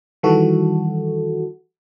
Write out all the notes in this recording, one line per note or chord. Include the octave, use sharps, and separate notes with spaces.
D#3 E3 G3 F#4 A4